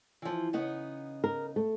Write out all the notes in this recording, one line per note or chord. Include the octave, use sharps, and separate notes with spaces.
E3 F3
C#3 B3 D#4
A#4
A3